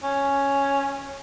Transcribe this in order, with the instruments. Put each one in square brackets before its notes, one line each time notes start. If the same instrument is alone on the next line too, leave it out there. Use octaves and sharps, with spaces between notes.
[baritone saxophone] C#4